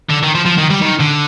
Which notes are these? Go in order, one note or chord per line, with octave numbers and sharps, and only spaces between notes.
D3
D#3
F3
F3
D#3
G3
D#3
D3